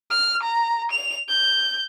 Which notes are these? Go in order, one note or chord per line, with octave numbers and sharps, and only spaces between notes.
F6
A#5
F7
G6